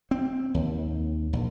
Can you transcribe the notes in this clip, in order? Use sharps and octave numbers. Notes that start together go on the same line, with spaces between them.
C4
D#2
A#1